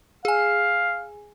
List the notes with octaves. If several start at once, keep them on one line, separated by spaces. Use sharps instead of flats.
G#4 F5 G#5